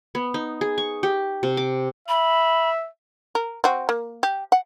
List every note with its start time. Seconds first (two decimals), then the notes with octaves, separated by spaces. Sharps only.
0.15 B3
0.34 D#4
0.61 G#4
0.78 C#6
1.03 G4
1.43 C3
1.57 D6
2.09 E5 B5
3.35 A#4
3.64 C4 F#4
3.89 A#3
4.23 G4
4.52 F#5